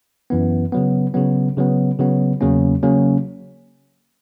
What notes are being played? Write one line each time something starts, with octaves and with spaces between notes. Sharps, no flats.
F#2 E3 B3
C#3 F#3 B3
C#3 F#3 B3
C#3 F#3 B3
C#3 F#3 B3
E2 C#3 F#3 A#3 C#4
C#3 F#3 A#3 C#4